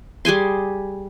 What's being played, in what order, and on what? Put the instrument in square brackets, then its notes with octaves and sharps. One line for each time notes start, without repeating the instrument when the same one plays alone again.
[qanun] G3 G#4 G#5 C6